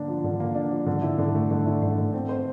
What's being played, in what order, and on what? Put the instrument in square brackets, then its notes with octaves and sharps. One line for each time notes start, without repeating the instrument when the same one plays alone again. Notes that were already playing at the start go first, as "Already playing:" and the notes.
Already playing: [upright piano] D3 A#3 D4
F3
D3
A#3
D4
F3
D3
E4
D3
A3
D3
E4
D3
A3
C4
C5